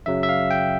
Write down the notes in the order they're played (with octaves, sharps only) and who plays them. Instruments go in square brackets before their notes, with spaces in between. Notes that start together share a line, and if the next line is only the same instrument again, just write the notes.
[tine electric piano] F#2 C#3 F#3 E5
E5
F5
G5